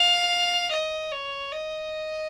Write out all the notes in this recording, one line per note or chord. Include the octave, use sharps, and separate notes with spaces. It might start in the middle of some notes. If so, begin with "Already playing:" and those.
Already playing: F5
D#5
C#5
D#5